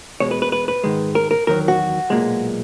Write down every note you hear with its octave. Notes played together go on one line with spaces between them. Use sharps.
E2 B2 G#3 C#5
B4
B4
B4
B4
G#2 D#3 G#3
A#4
A#4
E2 D#3 F#3 A#4
F#4
B1 A#2 G#3